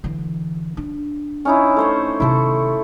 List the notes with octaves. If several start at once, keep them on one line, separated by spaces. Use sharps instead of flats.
D3 E3
D4
C#4 D#4 E4
A3 C5 C#5
C3 D#3 E4 A4